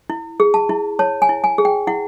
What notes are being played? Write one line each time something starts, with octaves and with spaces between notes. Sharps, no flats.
E4
G#4
A5
E4
C#5 A5
G#5
E4
G#5
G#4
G5
E4 F#5